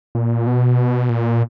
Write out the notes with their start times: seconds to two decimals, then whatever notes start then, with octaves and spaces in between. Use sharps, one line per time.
0.15 A#2
0.47 B2
1.09 A#2